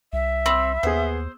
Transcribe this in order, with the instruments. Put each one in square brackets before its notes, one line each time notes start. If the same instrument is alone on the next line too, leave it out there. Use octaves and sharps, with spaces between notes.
[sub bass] C2 [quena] E5
[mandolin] C4 [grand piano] B5 E6
[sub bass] D#2 [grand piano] B3 G#4 [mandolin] C5